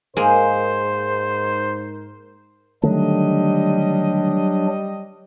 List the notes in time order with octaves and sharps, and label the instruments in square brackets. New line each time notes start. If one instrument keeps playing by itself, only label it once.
[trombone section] G#2 A#4 [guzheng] G#3 A#3 G#4 [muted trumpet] C5
[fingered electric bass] D3 D#3 A3 [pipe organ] F#3 D4 [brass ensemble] G3 D#5